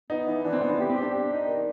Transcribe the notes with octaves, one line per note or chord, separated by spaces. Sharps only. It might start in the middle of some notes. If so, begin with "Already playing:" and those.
B3 D#4
E3
E3 D4
C4
E3 B3
C4
B3 G4
C4
G4
D4
G4
D#4
D#3